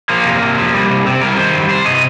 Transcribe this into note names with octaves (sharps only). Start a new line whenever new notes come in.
F3 A#3
C3
C3
F3
G3
C3
C3 C4
G3 A#4
D#3 C5
G3
C3 C5
C3 D#5